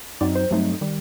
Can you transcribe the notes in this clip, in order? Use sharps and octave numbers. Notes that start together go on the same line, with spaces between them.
F#2 F#3 C4 D#4 D5
C5
G2 F#3 A3 C4 D#4
D#3 G3